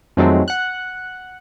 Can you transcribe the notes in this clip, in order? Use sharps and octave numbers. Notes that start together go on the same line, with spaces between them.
F2 D#3 F#3 G#3 A3 C4
F#5 F#6